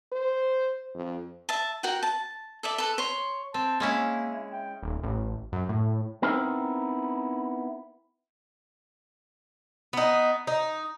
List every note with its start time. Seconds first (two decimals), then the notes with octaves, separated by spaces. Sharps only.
0.12 C5
0.95 F2
1.49 E5 A5
1.83 F#4 A#4 F#5 G5
2.03 A5
2.63 A4 D5 E5
2.78 A4 B4
2.98 C#5 C6
3.54 C4 A5
3.80 G#3 A#3 C#4 E4
4.52 G5
4.83 D#1
5.03 A1
5.52 F#2
5.69 A2
6.22 B3 C4 D#4 E4 A#4 C5
9.93 B3 D#4
10.47 D#4